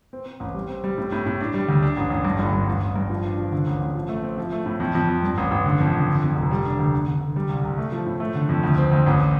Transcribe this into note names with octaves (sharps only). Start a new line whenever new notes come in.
C4
C4
A1
G3
C4
G3
A2
A2
A2
D4
G3
D2
D4
A1
A1
G2
G1
G2
A1
A1
G2
F3
D4
F3
D3
A1
A1
F3
A3
C4
F3
A3
A2
F2
F2
F2
G2
A1
A1
D3
F2
D3
D3
F2
F1
G3
D4
D2
D3
D3
D3
G3
C2
C2
A3
F3
A2
A3
D3
F2
D2
C4
D2
A1